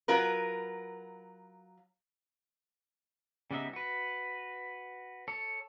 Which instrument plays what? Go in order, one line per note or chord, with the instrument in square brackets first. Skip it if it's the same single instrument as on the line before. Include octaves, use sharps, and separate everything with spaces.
[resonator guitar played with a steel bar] F#3 F4 A#4 B4
[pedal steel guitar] C#3 G3 B3 D#4 E5
F#4 B4
A4 C#5